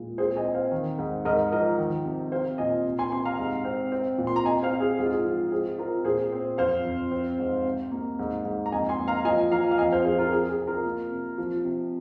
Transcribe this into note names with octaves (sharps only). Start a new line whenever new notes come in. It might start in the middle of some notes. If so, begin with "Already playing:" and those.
Already playing: A#2 G#3
C4 G#4 C5
D#5 G#5
C4
C5 F5
D#3
G#2
G#2 A#4 D#5
F3 A#4 D#5
D#3
C3
C4 C5 F5
A#2 D#5 G#5
C3
G#5 C6
C3 G#5 C6
F5 A#5
G#2
C4
C4
A#2
C6
A#5
C3 D#5 G#5
C5 F5
C4
G#4 C5
G#2 G#4
F4
G#4
F3
C4 G#4
C4 F4 A#4
A#2 G#4 C5
C4
F2 C5 F5
F2
C4
G#2
C3
A#3
G#2
G#2
A#5
F2 D#5 G#5
G#5 C6
A#3
F5 A#5
F3 D#5 G#5
F3 F5 A#5
F5
F2 D#5 G#5
C5 F5
F3 G#4 C5
F4 A#4
C4 G#4
G#4
C3
F4 A#4
A#3
C3
F3
C3